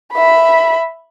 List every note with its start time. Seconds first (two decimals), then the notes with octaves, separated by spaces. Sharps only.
0.13 E5 B5